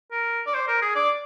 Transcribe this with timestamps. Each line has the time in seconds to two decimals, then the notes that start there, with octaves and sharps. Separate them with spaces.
0.11 A#4
0.47 D5
0.54 C5
0.68 A#4
0.82 G#4
0.95 D5